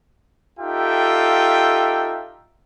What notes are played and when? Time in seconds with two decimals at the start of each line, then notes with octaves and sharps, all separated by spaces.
0.59 D#4 F4 G4 A4 E5 G5